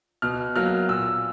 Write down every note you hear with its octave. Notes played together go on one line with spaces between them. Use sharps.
B2 F6
F#3 A#3 F6
A#2 E6